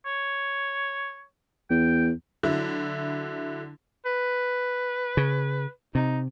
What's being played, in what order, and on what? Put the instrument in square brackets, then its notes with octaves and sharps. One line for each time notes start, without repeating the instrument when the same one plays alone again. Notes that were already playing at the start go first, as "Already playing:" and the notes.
[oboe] C#5
[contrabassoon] E2 [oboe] G5
[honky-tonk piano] D3 F#3 E4
[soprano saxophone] B4
[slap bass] C#3
[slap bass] C3 [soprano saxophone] D#4